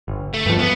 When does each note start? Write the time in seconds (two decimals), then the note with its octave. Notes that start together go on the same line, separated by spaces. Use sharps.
0.08 G1
0.34 A3
0.46 G2 F3
0.59 B3